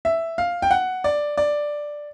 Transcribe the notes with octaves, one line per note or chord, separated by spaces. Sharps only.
E5
F5
G5
F#5
D5
D5